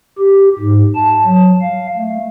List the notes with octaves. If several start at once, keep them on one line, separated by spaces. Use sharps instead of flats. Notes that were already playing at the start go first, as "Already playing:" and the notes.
G4
G#2
A5
F#3
F5
A3